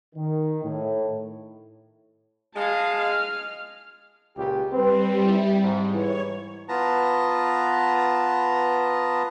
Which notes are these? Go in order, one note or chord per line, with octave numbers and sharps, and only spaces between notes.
D#3
A2
G#3 F5 A5
F6
C#2 A#2 G4
G3 C4 B4
E4
G#2
E3 C#5
B3 F4 B4 A5 A#5